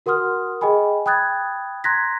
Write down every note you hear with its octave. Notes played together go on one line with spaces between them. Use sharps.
F#4 A#4 F#5 C6 D#6 F6
G#4 D#5 G5 G#5 B5
G5 B5 D#6 F#6 G#6 A6
A#5 C6 F#6 G#6 A#6 B6